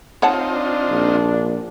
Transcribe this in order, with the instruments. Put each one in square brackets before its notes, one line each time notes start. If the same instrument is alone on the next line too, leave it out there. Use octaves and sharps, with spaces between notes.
[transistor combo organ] C4 D#4 F4 [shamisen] C#5 F#5 A5
[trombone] D4
[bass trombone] A#1